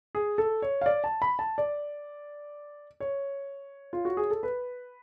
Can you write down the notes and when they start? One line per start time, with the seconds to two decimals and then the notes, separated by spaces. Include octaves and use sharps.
0.15 G#4
0.38 A4
0.62 C#5
0.81 F5
0.86 D5
1.04 A5
1.22 B5
1.39 A5
1.58 D5
3.00 C#5
3.93 F4
4.05 F#4
4.17 G#4
4.31 A4
4.43 B4